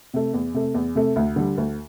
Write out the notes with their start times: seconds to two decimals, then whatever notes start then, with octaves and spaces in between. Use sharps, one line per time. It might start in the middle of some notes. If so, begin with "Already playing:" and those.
0.14 C3 A3
0.34 E2
0.54 C3 A3
0.74 E2
0.95 C3 A3
1.16 D2
1.36 D3 G3
1.58 D2